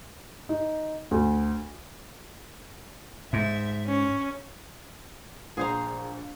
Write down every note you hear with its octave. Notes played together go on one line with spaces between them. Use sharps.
D#4
D2
G#2 E5
C#4
A#1 G#4 C5 A#5